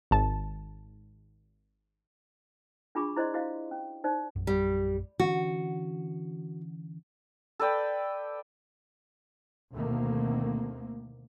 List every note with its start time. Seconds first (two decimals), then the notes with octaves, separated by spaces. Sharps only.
0.11 G#1 A5
2.95 D4 F4 G#4 B5 C#6 D6
3.16 E4 C5 D5 D#5 C6
3.34 E4 F#4 C5 D#5 F5
3.71 C#4
4.04 D#4 C5 D5
4.36 A#1 F#2
4.47 G3
5.19 D3 E3 C#4 F#4
7.60 A4 B4 D5 G5
9.73 D2 B2 D#3 A3 A#3 C4